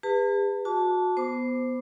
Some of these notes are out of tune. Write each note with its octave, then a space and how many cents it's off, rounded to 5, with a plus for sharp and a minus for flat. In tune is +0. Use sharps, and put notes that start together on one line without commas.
G#4 -45 B4 +0 A5 +40
F#4 -25 A5 -5 D6 -30
B3 +0 C5 -10 D6 +10